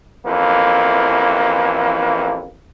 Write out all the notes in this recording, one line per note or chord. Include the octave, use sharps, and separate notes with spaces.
A1 F2 E3 A#3